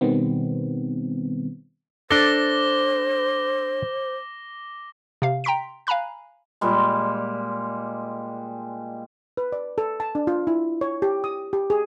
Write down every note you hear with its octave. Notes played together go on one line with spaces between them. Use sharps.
B2 D#3 G3 B3 C4
D4 A4 C5 D6 A#6 G7
C3 F5
G5 A#5 C6 B6 D7
F5 G#5 A#5 B5 F#6
A#2 G3 G#3
B4
D5
A4
A5
D4
F4
E4
C#5
G4
D#6
G4
G#4